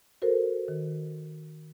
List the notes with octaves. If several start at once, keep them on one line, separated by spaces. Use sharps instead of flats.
F#4 A4 A#4 C5
D#3